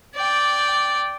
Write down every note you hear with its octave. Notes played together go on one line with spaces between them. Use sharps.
D5 G5